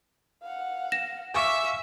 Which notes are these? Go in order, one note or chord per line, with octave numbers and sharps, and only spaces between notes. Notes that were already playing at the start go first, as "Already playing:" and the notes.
F5 F#5
A#6 E7
E5 F5 G#5 C#6 D6